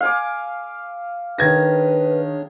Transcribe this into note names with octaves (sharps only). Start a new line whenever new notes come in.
F5 G#5 D6
D#3 D4 G#4 B4 C#5 G#6 A#6